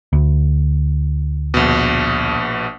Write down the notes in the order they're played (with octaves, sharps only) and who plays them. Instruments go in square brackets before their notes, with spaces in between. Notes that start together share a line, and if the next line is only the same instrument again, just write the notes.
[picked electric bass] D2
[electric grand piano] A#1 B2